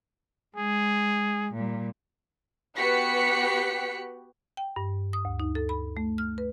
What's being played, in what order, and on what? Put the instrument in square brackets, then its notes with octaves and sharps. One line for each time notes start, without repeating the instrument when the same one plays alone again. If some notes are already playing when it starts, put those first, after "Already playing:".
[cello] G#3 [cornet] G#4
[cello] A#2 G3
[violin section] B3 F#4 G4 F#6 B6 C#7
[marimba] G5
G2
D#6
D2
D#4
A4
B5
A3
F6
B4